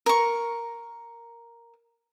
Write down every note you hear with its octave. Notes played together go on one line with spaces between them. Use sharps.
A#4 C#6